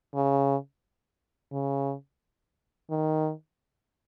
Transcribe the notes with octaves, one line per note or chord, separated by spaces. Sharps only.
C#3
C#3
D#3